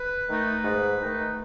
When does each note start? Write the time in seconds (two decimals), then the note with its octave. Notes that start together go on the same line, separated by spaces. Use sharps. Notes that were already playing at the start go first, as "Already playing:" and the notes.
Already playing: B4
0.28 D#3 A3 D#4
0.64 G#2
1.00 D#3 A3 D#4